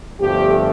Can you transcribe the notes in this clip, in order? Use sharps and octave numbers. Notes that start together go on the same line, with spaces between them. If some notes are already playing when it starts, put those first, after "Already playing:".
G1 G2 F3 A3 G4